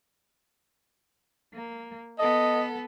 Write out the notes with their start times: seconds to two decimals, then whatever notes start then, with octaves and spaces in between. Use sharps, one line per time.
1.52 A#3
2.19 B3 A4 D#5